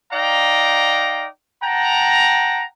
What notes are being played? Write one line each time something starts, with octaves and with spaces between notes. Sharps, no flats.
D#4 D5 F5 G5 A#5
F#5 G5 A5 A#5